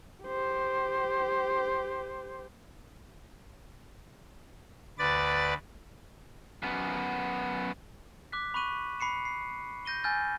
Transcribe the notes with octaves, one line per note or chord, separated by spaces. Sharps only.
G4 C5
D2 B4 D5 A6
F#2 B3
D6 F#6 B6
B5 C#6 F#6 D#7 F#7
B5 C7 C#7 E7
C7
G6 A#6 D#7 G7
G#5 E6 F6 G6 A6